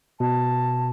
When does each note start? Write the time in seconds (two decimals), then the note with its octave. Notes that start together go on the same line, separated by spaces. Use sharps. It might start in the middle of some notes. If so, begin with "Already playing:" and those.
0.20 B2 A5